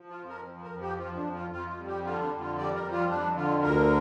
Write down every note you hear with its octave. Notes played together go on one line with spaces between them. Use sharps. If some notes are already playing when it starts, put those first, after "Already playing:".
Already playing: F3
F4
F2
A#4
F3
A#4
F2
G4
F3 F4
D4
F2
F4
F2 F4
F4
G3
G4
D3 F4
D4
F2
F4
G3 D5
A#4
F2
F4
F2 D4
D3 F4
D2 A#4